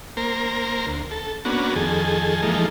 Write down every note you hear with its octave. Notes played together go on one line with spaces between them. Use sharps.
A#3 A#4 C5
D2
A4
A#3 B3 C#4 D4 F#4
F2 D#3 G#4 A4
E3 F3 G#3 A#3 D#4 A4